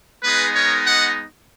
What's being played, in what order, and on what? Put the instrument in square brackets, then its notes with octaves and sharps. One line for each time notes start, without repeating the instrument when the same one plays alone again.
[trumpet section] G#3 B3 D#4 G#4 B4
A#4 C#5
D#5 F#5